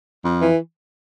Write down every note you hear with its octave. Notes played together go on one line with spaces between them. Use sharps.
F2
E3